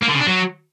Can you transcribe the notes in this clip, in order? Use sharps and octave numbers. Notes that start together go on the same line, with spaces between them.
A#3
D3
C#3
D4
F#3